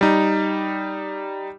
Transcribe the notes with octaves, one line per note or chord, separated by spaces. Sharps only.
G3 D#4